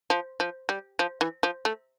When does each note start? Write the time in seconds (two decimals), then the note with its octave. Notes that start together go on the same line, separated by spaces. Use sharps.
0.10 F3
0.40 F3
0.69 G3
0.99 F3
1.21 E3
1.43 F3
1.65 A3